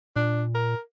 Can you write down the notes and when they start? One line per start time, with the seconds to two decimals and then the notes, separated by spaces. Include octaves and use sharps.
0.16 A#2 D4
0.55 A#4